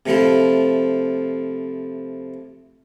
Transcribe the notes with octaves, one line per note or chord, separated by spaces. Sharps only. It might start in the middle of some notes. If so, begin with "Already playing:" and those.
C3 F3 A3 E4 F4